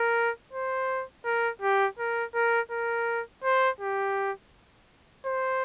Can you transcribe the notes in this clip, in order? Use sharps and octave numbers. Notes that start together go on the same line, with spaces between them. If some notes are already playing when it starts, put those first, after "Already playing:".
Already playing: A#4
C5
A#4
G4
A#4
A#4
A#4
C5
G4
C5